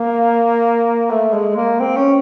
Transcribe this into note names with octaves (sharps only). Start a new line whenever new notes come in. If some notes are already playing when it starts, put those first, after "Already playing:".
Already playing: A#3
A3
G#3
A#3
C4
C#4